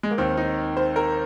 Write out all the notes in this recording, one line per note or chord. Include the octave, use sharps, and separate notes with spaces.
G#3
A#3
D#2 D#3 C4
D#4
C5
A#4